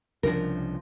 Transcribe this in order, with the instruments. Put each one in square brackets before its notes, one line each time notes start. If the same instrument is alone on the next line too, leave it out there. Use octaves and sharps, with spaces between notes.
[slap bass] C2 C#3 D4 [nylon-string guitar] F3 A#4